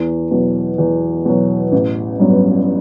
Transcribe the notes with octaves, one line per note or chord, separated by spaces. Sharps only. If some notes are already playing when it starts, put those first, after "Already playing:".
Already playing: E2
B2 F#3
E2
B2 F#3
A1
G2 F#3 B3